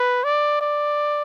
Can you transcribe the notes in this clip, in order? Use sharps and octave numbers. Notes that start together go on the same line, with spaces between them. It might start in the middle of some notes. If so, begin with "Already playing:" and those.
Already playing: B4
D5
D5